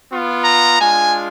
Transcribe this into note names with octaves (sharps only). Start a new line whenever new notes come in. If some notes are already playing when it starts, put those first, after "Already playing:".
B3 F4
A#5
G#3 D4 F4 G#5